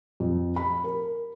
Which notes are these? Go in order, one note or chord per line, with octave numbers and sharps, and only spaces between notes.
F2
B5
A#4